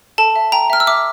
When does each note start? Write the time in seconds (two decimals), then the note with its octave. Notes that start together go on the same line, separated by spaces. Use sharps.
0.18 A4 A5
0.36 E5
0.52 G5 A#5
0.70 E5 F6
0.80 E6
0.87 E5 D6